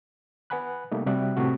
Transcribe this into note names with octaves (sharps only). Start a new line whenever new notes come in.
B4 F#5 G#5 B5 F#6
C3 G3 A3 A#3 D#4
C3 G3 F#4 E5 F#6
A2 C3 A3 F#4